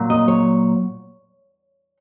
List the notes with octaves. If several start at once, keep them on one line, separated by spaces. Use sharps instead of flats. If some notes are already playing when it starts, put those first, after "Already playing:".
Already playing: A#2 F#3
D#5
C#5